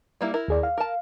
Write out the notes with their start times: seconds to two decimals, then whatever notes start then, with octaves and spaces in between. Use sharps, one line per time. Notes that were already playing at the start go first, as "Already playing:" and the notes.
0.21 G3 A#3 E4
0.34 E4 A#4
0.48 D#2 G#4 D5
0.63 F5
0.78 A#4 A5